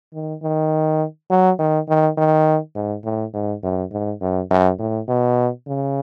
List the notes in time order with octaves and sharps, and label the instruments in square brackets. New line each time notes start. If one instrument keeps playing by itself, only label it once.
[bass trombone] D#3
D#3
F#3
D#3
D#3
D#3
G#2
A2
G#2
F#2
G#2
F#2
F#2
A2
B2
C#3